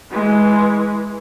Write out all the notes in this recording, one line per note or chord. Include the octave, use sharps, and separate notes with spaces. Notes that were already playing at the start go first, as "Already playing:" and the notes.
E3 G#3